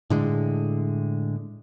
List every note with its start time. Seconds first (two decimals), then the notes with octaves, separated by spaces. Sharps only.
0.10 A2 D3 G#3